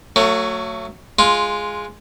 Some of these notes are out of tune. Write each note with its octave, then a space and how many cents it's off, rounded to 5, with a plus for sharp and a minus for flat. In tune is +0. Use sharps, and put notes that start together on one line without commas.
F#3 +0 A3 +35
G#3 +0 F4 +0